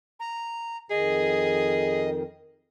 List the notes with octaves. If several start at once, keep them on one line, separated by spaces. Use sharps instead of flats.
A#5
F2 D#3 G#4 D#5